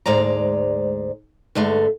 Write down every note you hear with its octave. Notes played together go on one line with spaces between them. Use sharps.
D2 G#2 G#3 D5 A#5
G2 D3 G#3 A3